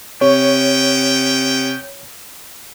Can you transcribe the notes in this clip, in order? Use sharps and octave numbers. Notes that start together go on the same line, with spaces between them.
C3 B3 C#4 C#5 G5